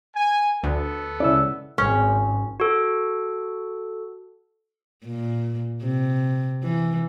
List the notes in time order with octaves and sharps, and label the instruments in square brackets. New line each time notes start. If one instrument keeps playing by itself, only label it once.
[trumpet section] G#5
[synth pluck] D2 [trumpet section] B3 A4
[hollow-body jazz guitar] C#2 D5 [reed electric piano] C#4 E4 E6
[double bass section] G#1 [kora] C#4
[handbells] F#4 A4
[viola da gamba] A#2
C3
E3